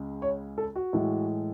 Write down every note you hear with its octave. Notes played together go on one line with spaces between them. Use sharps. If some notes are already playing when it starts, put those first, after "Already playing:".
Already playing: C#2 C#3 G#3
C#5
A4
F#4
A2 E3 G#3